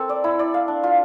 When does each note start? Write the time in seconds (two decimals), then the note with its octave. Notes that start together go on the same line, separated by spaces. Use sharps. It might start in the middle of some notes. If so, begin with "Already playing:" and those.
Already playing: C4 A4 A#4
0.09 D5
0.24 E4
0.39 D5
0.54 F5
0.68 D4
0.84 F4